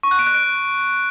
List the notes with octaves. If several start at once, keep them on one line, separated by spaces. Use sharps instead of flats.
C#6
F#6
D7
F#6
D7